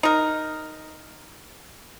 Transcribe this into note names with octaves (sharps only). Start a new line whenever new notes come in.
D#4 A#4